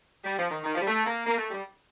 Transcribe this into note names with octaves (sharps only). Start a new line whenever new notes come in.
G3
F3
D#3
D#3
F3
G3
A3
A#3
A#3
A3
G3